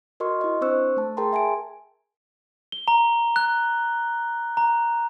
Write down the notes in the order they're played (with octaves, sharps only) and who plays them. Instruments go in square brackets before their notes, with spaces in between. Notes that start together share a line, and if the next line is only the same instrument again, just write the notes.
[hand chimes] F#4 A#4 D#5 C6 C#6 F6
E4 D#5
C4 D4 C5 C#6 E6 F#6
A3 A5
G#4 A#4 G5 A5 A#5 C6
E5 G#5 A5 D7
[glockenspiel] G7
A#5
F#6
A#5